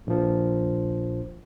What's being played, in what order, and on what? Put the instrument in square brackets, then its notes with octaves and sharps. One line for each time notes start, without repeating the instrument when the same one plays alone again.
[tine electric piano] A#1 F3